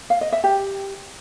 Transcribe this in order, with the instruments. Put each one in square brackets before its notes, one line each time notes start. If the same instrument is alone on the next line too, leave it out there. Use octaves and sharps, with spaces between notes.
[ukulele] F5
D#5
E5
G4